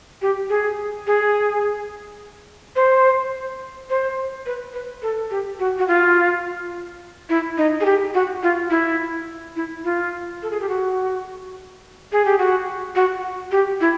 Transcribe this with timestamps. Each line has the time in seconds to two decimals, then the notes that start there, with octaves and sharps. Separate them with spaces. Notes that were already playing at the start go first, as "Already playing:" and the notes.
0.22 G4
0.49 G#4
1.07 G#4
2.76 C5
3.90 C5
4.46 B4
4.74 B4
5.02 A4
5.30 G4
5.59 F#4
5.78 F#4
5.88 F4
7.29 E4
7.58 D#4
7.81 G#4
7.85 G4
8.14 F#4
8.43 F4
8.70 E4
9.56 E4
9.84 F4
10.42 A4
10.51 G#4
10.61 G4
10.69 F#4
12.12 G#4
12.25 G4
12.39 F#4
12.96 F#4
13.51 G4
13.81 E4